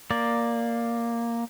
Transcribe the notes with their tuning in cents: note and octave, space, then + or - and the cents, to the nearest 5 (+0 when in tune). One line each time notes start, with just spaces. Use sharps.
A#3 +0 D5 +0